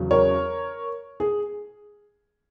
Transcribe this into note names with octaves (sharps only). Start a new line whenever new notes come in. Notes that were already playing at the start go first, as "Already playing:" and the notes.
Already playing: E2 C#3 F#3
A#4 C#5
G#4